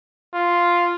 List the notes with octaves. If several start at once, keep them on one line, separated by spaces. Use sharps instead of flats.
F4